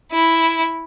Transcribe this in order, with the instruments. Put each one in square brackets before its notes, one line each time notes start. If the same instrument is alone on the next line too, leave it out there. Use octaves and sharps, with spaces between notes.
[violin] E4